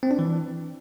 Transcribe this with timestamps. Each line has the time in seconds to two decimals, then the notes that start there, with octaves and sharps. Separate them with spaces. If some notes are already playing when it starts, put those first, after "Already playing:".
0.03 C4
0.11 D4
0.19 E3